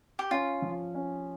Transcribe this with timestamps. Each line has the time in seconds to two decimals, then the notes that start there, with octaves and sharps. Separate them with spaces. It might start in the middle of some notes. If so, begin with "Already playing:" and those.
0.19 G4
0.31 C#4 F4
0.62 F3
0.95 C#4